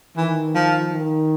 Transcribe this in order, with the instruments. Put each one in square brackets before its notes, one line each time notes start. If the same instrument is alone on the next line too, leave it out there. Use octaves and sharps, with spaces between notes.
[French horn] D#3 [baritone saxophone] E3
[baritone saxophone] F3
[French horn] D#3